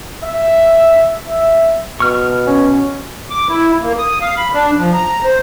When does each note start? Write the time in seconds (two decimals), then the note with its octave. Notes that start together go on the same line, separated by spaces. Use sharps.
0.23 E5
1.28 E5
2.00 B2 C#6 F6
2.47 C#4
3.30 D6
3.49 E4
3.82 A#3
3.98 D#6
4.21 F5
4.37 B5
4.53 D4
4.77 F3
4.94 A#5
5.24 C5